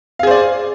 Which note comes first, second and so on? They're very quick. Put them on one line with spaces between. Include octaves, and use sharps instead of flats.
F5 G#4 C5 D5